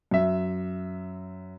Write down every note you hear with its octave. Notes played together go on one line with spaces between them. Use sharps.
F#2 E5